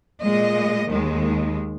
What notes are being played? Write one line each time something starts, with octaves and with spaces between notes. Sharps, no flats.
A#2 G#3 D#5
D#2 D#3 G#3